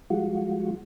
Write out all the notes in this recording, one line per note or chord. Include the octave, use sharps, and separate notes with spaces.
F3 G3 G#3 F4 F#4